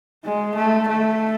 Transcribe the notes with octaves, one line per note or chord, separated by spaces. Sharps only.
G#3
A3
A3